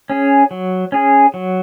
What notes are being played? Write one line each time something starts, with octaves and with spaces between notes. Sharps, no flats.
C#4 G#4
F#3
C#4 G#4
F#3